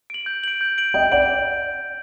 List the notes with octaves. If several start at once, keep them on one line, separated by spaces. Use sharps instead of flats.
D7 F#7
G6
D7 F#7
G6
D7 F#7
D#5 G5 G6
D5 F#5 D7 F#7